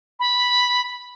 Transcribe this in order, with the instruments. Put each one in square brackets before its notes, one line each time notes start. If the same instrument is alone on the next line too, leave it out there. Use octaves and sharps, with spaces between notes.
[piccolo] B5